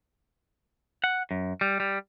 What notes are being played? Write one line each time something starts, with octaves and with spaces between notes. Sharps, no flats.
F#5
F#2
G3
G3